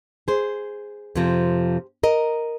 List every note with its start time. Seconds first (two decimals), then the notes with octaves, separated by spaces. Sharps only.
0.28 G#4 C5
1.15 F2 C3 F3
2.03 A#4 D#5